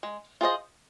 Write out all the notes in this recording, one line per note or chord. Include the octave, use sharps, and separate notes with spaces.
G#3
F4 G#4 C5 D#5